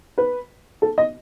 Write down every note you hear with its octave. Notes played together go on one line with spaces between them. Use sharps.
B4
A4
D#5